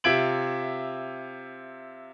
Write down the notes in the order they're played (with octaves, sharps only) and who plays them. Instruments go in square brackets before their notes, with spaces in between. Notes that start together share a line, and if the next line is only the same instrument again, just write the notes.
[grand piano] C3 F4 E5 G#6 D7 F#7